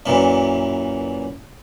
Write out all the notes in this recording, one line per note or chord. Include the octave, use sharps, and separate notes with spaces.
F#2 A#2 E3